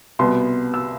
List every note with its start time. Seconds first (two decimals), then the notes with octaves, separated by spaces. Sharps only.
0.19 C2 B2 B3 C6
0.74 E6